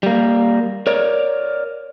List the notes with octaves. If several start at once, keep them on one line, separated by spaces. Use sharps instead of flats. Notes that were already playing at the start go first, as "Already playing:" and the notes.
G3 A#3
A#4 C#5 D5